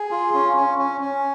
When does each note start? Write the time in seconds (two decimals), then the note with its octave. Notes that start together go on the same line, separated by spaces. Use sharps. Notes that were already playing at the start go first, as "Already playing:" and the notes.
Already playing: G#4
0.11 F4
0.34 C#4
0.57 C#4
0.78 C#4
1.01 C#4